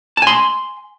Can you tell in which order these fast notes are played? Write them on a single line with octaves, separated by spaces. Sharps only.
A5 G#5 C6